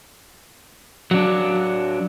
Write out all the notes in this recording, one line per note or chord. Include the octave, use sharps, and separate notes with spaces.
F#3 D4